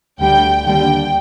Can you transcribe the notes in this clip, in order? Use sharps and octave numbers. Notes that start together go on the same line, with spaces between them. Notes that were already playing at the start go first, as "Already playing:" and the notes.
D2 D3 G3 G5
D#2 D3 G3 G5